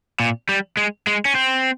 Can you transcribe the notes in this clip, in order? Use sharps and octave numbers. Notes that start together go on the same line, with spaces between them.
A#2
G3
G#3
G#3
C#4
C4